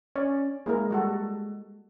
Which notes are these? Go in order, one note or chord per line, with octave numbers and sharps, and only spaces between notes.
C#4 D5
G#3 A#3 E4 A#4
G3 F#4 A4